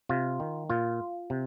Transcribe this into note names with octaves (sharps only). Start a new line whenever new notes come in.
C3 F4
D#3
A#2 F4
C3